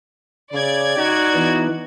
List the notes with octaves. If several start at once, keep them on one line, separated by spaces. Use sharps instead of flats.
C#3 D5 G#6
D#4 F#4
E3 B3